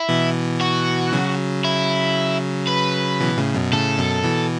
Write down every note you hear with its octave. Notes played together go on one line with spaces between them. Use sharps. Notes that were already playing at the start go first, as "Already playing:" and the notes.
Already playing: E4
B2 E3
F#4
C#3 F#3
E4
B4
B2 E3
A2 C#3
F#2 B2
A2 C#3 A4
F#2 B2
B2 E3